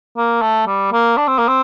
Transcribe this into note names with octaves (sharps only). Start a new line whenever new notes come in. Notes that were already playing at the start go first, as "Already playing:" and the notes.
A#3
A3
G3
A#3
D4
C4
A#3
C4